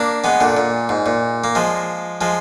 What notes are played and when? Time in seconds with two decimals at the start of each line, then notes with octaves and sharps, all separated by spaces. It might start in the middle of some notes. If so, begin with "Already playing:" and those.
Already playing: A#3 D4
0.24 G#3 B3
0.40 A#2 D3
0.57 A#2
0.89 G#2
1.06 A#2
1.44 A#3
1.55 F3 G#3
2.21 F3 G#3